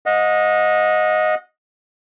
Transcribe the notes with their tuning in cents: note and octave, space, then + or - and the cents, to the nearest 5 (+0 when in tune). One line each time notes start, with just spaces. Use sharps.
D#5 +0 F#5 -35